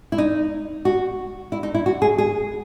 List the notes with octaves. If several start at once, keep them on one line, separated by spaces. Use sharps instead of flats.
E4
D#4
F#4
E4
D#4
E4
F#4
G#4
G#4